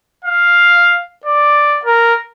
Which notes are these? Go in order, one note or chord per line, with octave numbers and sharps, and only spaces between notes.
F5
D5
A#4